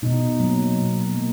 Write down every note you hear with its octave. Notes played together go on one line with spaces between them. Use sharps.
B2 D#4
F#3 A#3
B2
F#3 A#3